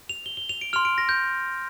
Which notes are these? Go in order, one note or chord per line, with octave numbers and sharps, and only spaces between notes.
F7
G7
G7
F7
D7
C6 F6 F7
D7
A#6
G6